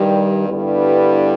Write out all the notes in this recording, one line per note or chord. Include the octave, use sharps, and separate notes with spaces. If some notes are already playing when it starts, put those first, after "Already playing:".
Already playing: G2 D#3 G3
G2 D3 G3 B3 E4